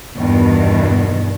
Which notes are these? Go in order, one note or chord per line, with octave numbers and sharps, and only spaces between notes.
E2 G2 B2 D#3